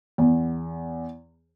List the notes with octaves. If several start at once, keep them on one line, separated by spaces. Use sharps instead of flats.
E2